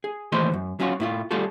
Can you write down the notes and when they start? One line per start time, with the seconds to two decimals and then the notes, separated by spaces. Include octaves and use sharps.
0.04 G#4
0.32 D#2 E3 A3 C5 D#5 C6
0.54 F#2
0.80 F#3 C#4 F4 F#4
1.00 A2 E4 F4
1.31 G3 A3 F4 F#4 G#4 A4